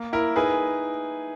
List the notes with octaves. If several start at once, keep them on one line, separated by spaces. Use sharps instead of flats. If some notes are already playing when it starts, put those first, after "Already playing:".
Already playing: A#3
E4 A#4
D#4 G#4 B4